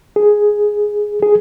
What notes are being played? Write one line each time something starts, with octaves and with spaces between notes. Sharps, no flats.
G#4
G#4